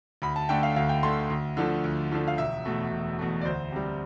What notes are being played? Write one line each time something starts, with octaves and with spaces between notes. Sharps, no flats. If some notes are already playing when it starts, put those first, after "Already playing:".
D2 B5
A5
D3 A3 G5
F5
D2 F5
G5
D3 A3 C6
D2
D3 F3 A3
D2
D3 F3 A3
F5
E1 E5
E2 B2 A3
E1
E2 B2 A3
D5
D2 C5
C3 G3